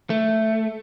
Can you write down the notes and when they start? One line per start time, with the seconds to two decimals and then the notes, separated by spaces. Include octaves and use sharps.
0.10 A3